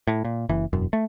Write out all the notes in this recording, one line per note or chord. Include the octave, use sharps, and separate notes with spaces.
A2
A#2
F#1 E3
E1 F#2
A3